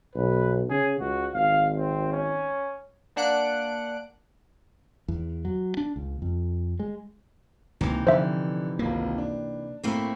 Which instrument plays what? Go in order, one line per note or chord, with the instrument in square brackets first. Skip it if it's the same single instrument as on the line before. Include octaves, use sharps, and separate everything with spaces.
[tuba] B1 [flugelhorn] B4
[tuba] C#3 [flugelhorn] G#4
[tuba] C#2 [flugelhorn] F#4
[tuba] G#1 [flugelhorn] F5
[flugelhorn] C4
C#4
[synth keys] A#3 D4 F#5 F#6 D7
[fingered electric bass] E2
F#3
D4
C#2
F2
G#3
[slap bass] C#2 F3 A#3 [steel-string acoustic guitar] C3 E3 D#4
[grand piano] D3 [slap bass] F3 [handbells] C5 E5
[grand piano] G#1 C#2 [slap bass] A#3
[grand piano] D4
[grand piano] A2 A#5 B5 [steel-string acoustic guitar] A3 A#3 C4